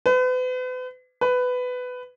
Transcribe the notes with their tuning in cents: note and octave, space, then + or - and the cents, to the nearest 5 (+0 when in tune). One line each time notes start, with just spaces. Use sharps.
B4 +40
B4 +15